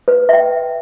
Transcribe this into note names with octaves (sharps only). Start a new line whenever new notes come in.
B4
E5 G5